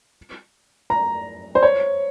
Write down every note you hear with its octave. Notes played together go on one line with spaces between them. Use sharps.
A#5
C5
C#5